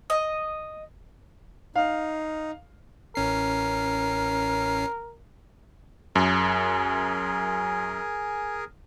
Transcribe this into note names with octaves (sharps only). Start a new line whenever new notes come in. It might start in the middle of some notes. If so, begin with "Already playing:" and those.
D#5
D#4 F5
A1 C#4 A#4 C7
F#2 G#4 A#4 G#5